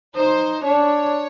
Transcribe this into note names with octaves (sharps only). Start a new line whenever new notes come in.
D#4 C5
D4 C#5